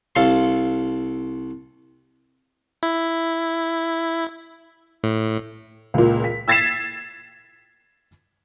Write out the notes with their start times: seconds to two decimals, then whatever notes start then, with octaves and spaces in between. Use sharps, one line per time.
0.15 C2 A4 F5 C6
2.83 E4
5.04 A2
5.94 C#2 A#2
6.24 B6
6.48 E6 G#6 A6 B6 C7 E7